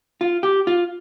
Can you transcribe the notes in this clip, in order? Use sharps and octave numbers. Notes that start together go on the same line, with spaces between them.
F4
G4
F4